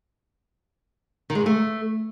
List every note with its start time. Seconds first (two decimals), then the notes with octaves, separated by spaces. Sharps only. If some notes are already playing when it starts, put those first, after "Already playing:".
1.30 D#3
1.35 G#3
1.41 G#2
1.46 A3